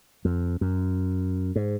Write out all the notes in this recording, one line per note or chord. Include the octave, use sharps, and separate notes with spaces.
F2
F#2
G#2